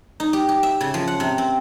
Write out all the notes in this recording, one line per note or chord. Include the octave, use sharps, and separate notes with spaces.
D#4
G4
G4
E5
C#3
F3
F#5
C3
C4